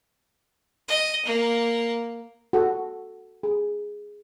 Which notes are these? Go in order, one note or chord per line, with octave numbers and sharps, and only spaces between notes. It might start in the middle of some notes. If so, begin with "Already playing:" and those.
D#5
A#3
F#4 A4
G#4